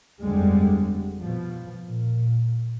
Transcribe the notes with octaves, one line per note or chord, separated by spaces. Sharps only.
G1 F2 D3 G3 G#3
B2 F3
A#2